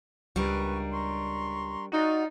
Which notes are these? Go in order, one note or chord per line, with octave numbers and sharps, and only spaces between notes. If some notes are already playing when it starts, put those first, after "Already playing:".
C#2 G3 D4 A#4 B4 C#6
A#5 C6 C#6
D#4 F4 F#4 D5